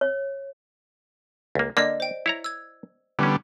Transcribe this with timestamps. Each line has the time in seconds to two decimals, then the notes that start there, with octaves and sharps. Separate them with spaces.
0.01 C#5
1.55 C#2 A#3
1.77 D3 A#3 D5 D#5
2.00 C5 G5
2.26 E4 C#5 A#5
2.44 E6 G#6
3.19 D3 E3 G3 B3 C#4